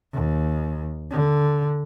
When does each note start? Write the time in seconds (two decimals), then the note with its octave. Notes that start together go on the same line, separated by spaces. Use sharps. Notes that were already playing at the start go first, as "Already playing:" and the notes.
0.13 D#2
1.11 D3